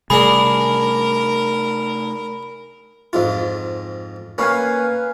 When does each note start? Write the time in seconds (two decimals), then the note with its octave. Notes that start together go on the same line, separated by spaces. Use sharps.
0.10 C3 G3 A3 D4 G#4 A#4 B5
3.13 F2 G#2 F4
4.38 A#3 C#4 B4 F5 G#5